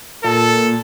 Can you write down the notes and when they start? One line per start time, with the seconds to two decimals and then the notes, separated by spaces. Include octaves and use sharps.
0.24 A#2 A4